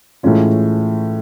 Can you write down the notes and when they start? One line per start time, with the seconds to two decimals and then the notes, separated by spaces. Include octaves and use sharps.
0.23 A2 E3 G#3 C#4 F4